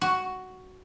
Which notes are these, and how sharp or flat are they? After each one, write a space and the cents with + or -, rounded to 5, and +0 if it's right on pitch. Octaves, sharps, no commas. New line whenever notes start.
F#4 +5